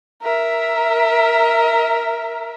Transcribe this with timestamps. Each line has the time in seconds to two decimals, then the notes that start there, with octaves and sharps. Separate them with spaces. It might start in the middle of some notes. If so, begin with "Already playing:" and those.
0.22 A#4 E5